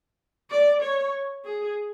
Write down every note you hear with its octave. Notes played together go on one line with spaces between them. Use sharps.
D5
C#5
G#4